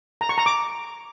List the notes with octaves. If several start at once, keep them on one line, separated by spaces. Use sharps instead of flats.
A#5
C#6
A#5
D6